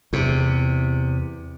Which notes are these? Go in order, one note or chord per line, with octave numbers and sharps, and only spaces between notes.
E2 C3